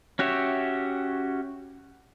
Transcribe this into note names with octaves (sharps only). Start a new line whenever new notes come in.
C#4 F#4 G4 C#5 E5